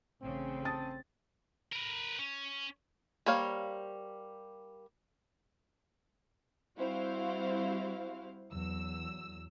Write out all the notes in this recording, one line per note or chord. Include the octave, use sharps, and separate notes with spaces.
A1 C#3 C4
A5 D#6 A6
A#4 B4
C#4
G3 A#3 C5 C#5 F5
G3 C4 E4 F#4 C5 F5
E2 F#3 E6